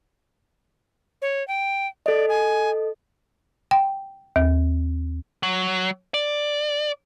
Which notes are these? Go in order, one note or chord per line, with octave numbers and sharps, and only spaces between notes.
C#5
G5
A4 D5 D#5
G#5
G5
D#2
F#3
D5